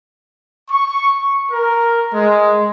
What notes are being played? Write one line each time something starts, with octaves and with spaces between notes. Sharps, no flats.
C#6
A#4
G#3